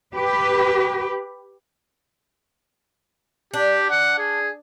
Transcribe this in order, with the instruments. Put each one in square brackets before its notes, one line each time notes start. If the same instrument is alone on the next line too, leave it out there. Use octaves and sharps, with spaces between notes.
[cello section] G4 B4
[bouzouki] D4 [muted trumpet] G4
[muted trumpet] F#5
G#4